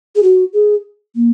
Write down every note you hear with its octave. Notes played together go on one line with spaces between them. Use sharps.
G#4
F#4
G#4
A#3